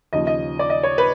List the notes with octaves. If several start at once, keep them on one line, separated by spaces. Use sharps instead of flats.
D#2 C#3 F3 D#5
D#5
D5
D#5
C#5
B4